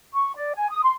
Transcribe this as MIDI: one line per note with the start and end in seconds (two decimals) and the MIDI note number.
0.14 0.33 85
0.35 0.53 74
0.56 0.70 80
0.71 0.82 87
0.83 0.93 84